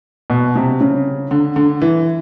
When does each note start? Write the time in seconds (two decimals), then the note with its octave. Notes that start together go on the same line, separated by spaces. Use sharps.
0.30 B2
0.55 C3
0.81 C#3
1.31 D3
1.56 D3
1.82 E3